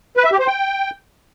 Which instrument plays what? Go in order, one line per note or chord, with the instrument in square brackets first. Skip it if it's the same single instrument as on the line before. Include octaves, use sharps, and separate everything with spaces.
[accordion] B4
E5
G4
C5
G5